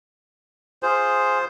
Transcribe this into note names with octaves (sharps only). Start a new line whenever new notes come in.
F4 G#4 C5